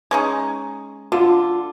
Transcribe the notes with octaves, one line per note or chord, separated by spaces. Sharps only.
G#3 C#4 D#4
D3 F4